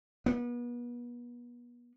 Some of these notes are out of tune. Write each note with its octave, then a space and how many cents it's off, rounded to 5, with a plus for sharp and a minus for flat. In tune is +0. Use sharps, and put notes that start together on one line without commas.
B3 -35